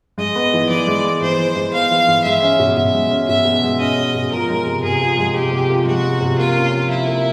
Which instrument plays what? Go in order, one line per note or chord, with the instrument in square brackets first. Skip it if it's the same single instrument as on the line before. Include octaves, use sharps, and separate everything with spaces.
[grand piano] G#3 [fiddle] D#5
[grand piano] B3
E3
[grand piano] E3 [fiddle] D5
[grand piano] G#3
B3
[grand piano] E3 [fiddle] C5
[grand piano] E3
G#3
[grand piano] B3 [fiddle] F5
[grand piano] E3
E3
[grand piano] G#3 [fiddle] E5
[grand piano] C#4
B2
[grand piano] B2 [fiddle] E5
[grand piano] G#3
C#4
[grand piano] B2 [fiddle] E5
[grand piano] B2
G#3
[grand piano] C#4 [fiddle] D#5
[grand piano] B2
B2
[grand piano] F3 [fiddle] A#4
[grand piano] G#3
C3
[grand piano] C3 [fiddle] G#4
[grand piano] F3
G#3
[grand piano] C3 [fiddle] G4
[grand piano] C3
F3
[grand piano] G#3 [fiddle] F#4
[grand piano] C3
C3
[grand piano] A#3 [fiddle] F4
[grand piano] C#4
F3
[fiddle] E4 [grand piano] F4
[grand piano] A#3